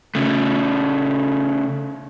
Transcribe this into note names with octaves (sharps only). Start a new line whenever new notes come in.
C#3 A3